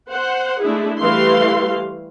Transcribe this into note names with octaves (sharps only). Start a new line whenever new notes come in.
C5 F#5
G#3 A3 D4 E4 G#4
E3 G3 A3 G4 F5 C6